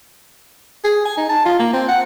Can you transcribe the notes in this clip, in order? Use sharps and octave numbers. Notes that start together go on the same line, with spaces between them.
G#4
G#5
D#4
A5
F4
A#3
C4
F#5